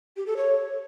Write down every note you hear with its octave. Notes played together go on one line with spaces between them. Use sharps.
G4
A4
C#5